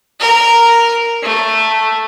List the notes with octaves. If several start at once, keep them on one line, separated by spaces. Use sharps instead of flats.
A#4
A3